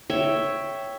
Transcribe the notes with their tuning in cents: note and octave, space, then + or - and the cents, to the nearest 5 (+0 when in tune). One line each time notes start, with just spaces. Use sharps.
C#5 +0 E5 +0 G5 +0